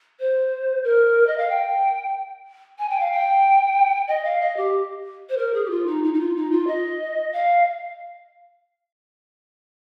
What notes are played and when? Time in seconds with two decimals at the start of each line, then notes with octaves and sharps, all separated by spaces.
0.20 C5
0.84 A#4
1.27 D#5
1.38 F5
1.49 G5
2.79 G#5
2.89 G5
3.00 F5
3.12 G5
4.08 D#5
4.24 F5
4.41 D#5
4.57 G4
5.29 C5
5.38 A#4
5.54 G#4
5.65 G4
5.70 F4
5.87 D#4
6.03 D#4
6.14 D#4
6.19 F4
6.36 D#4
6.51 F4
6.67 D#5
7.33 F5